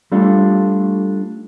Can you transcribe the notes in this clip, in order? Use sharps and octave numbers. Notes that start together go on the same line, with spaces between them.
G3 A3 D4 F4